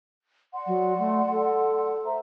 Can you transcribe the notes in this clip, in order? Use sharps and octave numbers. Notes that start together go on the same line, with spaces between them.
D5 F#5 C6
F#3
A3
A4
C5 E5 A#5